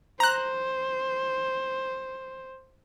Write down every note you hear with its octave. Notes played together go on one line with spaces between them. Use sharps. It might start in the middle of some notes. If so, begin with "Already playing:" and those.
C5 A#5 F#6